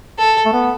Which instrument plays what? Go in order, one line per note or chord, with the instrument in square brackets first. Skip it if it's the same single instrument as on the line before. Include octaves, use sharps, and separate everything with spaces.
[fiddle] A4
[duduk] A3
B3